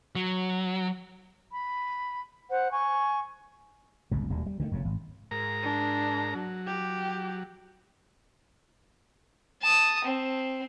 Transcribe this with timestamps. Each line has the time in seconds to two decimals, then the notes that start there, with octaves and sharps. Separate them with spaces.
0.15 F#3
1.52 B5
2.50 C5 F#5
2.72 G#5 C#6
4.11 G1 C#2 A#2
4.30 D#1 D2 G3
4.46 G3
4.60 D3 D#3 F3 A3
4.71 F1 F2 C#3
4.85 G#1
5.31 G#2 A#4 A#5
5.62 D4
6.35 F#3
6.67 G4
9.62 A5 D#6
10.05 C4